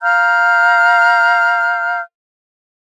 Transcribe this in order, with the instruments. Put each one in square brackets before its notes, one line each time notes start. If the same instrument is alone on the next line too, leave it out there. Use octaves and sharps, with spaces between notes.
[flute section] F5 A#5 F6 G6